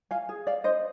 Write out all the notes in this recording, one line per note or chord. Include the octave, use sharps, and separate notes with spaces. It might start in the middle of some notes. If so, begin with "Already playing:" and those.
F5 G#5
G#4
D5 F5
D4 C5 D#5